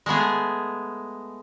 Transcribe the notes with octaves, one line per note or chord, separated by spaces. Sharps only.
G#3 A3 B3 G#4